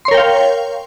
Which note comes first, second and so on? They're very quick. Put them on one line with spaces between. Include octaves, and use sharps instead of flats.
C6 C#5 A#4 G5 F5